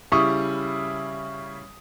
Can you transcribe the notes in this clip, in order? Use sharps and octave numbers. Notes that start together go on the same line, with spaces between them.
C#3 G3 E4 C#6 D#6